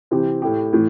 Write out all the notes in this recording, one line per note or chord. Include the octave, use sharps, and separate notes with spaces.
C3 E3 C4 G4
A2 A3 E4 G4
A2 E3